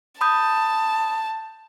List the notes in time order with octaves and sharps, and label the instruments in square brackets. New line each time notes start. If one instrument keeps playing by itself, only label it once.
[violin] A5 [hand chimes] B5 D#6 G6